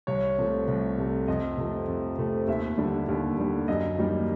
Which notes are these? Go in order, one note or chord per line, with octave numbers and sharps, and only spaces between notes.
C2 C#5
C3 F3 A3
C2
C3 F3 A3
F2 D#5
C3 F3 A3
F2
C3 F3 A3
D#2 E5
D3 G3
D#2
D3 G3
F#2 D#5
D#3 G3 A#3